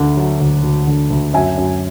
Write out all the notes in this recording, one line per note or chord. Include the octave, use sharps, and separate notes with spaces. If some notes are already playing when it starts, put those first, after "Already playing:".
Already playing: D2 D3
F#3
D2
D2
D3
D2
F#2 E5 G#5
F#2